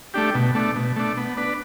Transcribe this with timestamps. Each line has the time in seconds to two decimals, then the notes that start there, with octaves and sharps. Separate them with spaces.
0.14 A3 D4 G4
0.35 B2
0.55 A3 D4
0.76 B2
0.96 A3 D4
1.17 B3
1.37 D4 B4